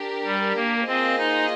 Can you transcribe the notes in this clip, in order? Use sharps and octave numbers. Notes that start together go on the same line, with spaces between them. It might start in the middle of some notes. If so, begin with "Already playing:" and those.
Already playing: D4 G4 A#4
G3
A#3
A#3 C4 F4 G#4 C5 D#5
D#4